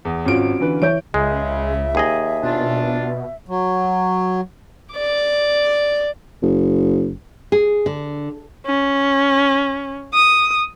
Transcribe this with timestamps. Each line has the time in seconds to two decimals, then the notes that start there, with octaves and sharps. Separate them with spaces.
0.05 E2
0.25 G#1 C#4 F4 F#4 D7
0.60 D3 E3 B4
0.82 E3 C#5 G6 D7
1.14 C#2 C#3 G#3 E5
1.95 D#2 G#4 D#5
2.43 B2 D4 F4
3.48 F#3
4.95 D5 D6
6.42 F#1
7.52 G#4
7.86 D3
8.66 C#4
10.14 D#6